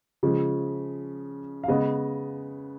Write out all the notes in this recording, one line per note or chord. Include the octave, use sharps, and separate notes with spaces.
C#3 F3 G#3
F5
C#3 G#3 B3 D#5